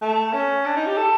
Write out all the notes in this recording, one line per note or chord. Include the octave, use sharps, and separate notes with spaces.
A3
C#4
D4
D#4
G4
A4